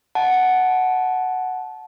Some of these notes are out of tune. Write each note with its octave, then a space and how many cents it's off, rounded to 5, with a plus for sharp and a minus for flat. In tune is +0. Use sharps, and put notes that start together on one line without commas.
F#5 +0 A5 -20